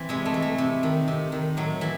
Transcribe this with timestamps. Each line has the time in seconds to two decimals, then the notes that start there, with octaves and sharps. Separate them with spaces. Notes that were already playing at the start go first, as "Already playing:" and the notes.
Already playing: E3 C4
0.09 C3 G#3
0.25 A3
0.34 E3
0.42 A3
0.58 C3
0.83 D#3
1.08 C3
1.32 D#3
1.57 A2 F#3
1.81 E3